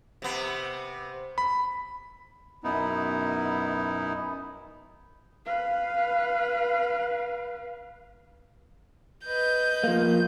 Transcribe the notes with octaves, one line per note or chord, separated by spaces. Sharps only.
C3 B3
B5
F#2 B2 B3 D#4 E4
B4 F5
B4 D#5 G6
F3 A#3